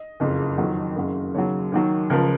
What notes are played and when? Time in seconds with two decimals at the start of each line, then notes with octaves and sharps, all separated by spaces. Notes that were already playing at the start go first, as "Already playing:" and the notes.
Already playing: D#5
0.20 F#1 F2 C#3
0.58 F2 D#3 F#3
0.96 F#1 F#2 C#3 F#3
1.34 D#2 C#3 F#3 C#5
1.72 D#2 D#3 F#3
2.10 C#2 C#3 F3 A#4